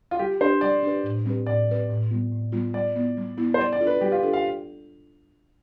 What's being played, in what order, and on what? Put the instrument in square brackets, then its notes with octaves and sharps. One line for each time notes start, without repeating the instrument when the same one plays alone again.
[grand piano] F4
[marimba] G3 [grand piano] G4
[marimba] D4 G4 B4 [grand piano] C5
[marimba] G3 [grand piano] D5
[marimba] D4 G4 B4
A2
G3 C4 G4 B4
[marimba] A2 [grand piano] D5
[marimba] G3 C4 G4 B4
A2
G3 B3 F4
A2
G3 B3 F4
[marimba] G3 [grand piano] D5
[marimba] B3 E4
G3
B3 E4
[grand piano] C5
[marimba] G3 [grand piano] D5
[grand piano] D5
[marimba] D4 F4 A4
[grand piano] B4
[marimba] G3 [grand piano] G4
[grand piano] F4
[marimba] D4 F4 A4
[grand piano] F5